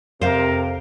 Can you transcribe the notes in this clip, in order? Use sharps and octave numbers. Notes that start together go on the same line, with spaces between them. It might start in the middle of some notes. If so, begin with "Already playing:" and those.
F2 C3 A#4 C5 F5